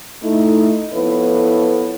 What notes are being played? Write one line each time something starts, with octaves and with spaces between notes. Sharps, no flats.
A3 D#4 E4
F3 B3 E4 A4 B4 C#5